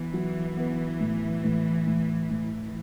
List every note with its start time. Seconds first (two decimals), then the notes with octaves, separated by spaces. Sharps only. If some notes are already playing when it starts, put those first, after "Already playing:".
Already playing: E3 B3
0.14 F#3
0.57 B3
1.01 A2
1.44 A2
1.87 A2
2.30 A2